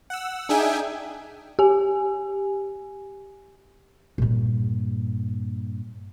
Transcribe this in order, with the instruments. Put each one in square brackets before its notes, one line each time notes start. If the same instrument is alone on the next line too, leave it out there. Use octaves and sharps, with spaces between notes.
[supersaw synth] F#5 E6
D4 D#4 G#4 E5 G5 G#5
[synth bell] G4 G#5
[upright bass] G2 A#2